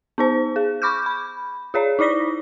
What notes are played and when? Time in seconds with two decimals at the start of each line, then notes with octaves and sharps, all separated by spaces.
0.18 B3 D#4 C5
0.56 G#4
0.82 B5 C#6 D6 F6 G6
1.06 B5
1.74 F4 G#4 C#5 D5
1.99 D#4 E4 D5 A#6 B6